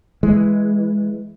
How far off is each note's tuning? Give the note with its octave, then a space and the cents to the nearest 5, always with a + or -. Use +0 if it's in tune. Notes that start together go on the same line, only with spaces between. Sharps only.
E3 +0 G#3 +0